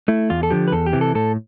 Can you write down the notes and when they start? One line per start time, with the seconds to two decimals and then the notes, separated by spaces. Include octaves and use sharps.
0.08 A3 E4
0.30 E2 F4
0.43 A4
0.50 D3 F3 G4
0.68 B4
0.72 E2 A4
0.86 G4
0.93 C3 E3
1.01 A4
1.15 A2 A4